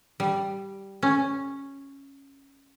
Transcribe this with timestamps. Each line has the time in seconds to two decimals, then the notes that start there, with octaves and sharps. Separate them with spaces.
0.20 G3
1.03 C#4